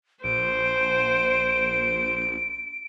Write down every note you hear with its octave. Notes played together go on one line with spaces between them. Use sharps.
A#1 C5 D7